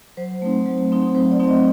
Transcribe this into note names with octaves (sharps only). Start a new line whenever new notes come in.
F#3 C5
A3 C4 D#4
F#3
A3 C4 D#4
F#3 C5
D5
A3 C4 D#4
D#5